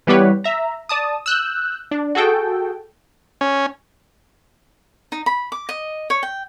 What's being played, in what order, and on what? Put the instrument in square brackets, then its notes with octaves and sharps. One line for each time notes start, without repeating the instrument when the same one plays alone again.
[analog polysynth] E3 G3 B3 G4 B4 C#5
E5 A#5
D5 A5 D#6
E6 F#6 G6
D4
F#4 G#4 A4 G5
[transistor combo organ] C#4
[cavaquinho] D#4
B5
D6
D#5
C#5
G5